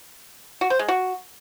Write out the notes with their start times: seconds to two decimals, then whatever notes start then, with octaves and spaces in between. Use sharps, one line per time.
0.61 F#4
0.70 C5
0.79 G#3
0.88 F#4